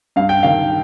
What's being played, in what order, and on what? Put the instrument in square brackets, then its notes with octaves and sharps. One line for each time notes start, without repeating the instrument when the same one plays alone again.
[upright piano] G2 [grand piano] F5
[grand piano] G5
[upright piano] D#3 [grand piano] F5